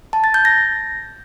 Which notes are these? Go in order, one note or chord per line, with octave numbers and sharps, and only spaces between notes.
A5
A6
G6
A#6